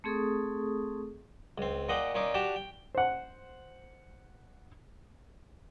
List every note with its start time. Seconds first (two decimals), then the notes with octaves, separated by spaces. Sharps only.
0.04 A3 C4 G#4 A4 C#6 D#6
1.58 C#2 C4
1.89 A#2 D#5 F#5 G5 D6
2.15 A#2 C#4 D#4 D6
2.34 D4 F#4 G4 G5 A5
2.56 G5
2.95 C5 F#5